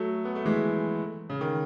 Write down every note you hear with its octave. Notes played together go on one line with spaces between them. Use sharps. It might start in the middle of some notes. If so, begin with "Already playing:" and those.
Already playing: F#3 A3
B3
A3
E3 G#3
C#3
D#3